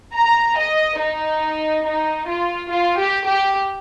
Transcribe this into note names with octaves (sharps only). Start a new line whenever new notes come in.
A#5
D#5
D#4
D#4
F4
F4
G4
G4